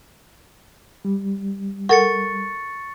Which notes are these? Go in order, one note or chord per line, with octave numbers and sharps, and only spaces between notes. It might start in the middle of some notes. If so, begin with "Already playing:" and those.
G3
A4 A#4 F#5 C#6 A6 C#7